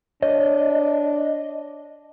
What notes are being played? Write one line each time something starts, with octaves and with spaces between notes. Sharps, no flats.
D4 C#5 D#5